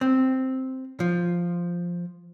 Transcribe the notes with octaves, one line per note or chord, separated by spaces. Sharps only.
C4
F3